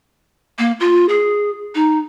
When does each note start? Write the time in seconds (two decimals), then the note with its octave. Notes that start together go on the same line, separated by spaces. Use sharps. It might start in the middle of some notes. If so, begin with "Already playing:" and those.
0.58 A#3
0.80 F4
1.09 G#4
1.75 D#4